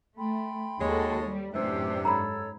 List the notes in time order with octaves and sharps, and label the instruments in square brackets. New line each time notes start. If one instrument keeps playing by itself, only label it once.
[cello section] A3 [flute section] G5 B5 C6
[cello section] D#2 F#4 A4 [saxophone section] G#3 C#5
[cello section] G3
[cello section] F#2 A2 G4 [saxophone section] C3 E3 D4 [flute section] C5 E6
[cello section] G#2 [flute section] A4 C#5 E6 [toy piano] A#5 B5